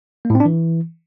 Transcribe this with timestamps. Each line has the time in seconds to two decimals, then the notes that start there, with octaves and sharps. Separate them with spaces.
0.25 A#3
0.30 A2
0.35 C4
0.40 D4
0.45 E3